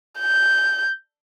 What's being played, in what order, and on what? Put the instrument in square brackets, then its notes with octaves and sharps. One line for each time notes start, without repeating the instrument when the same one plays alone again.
[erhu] G6